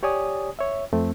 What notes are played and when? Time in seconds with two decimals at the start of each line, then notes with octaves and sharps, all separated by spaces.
0.03 G4 C#5 D5 G#5 D#6
0.59 C#5 E5
0.93 F2 A3 C4